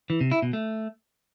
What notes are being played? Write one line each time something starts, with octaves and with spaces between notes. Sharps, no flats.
E3
C3
E4
B2
A3